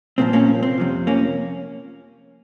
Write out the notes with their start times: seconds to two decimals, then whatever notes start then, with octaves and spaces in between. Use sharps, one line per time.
0.18 C2 A#2 F3 C4
0.33 A#3 C#4
0.62 C4
0.78 F2 C3 F3
1.07 A#3 C#4